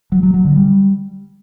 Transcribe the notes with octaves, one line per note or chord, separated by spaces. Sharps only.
F#3
F#3
F#3
D3
G3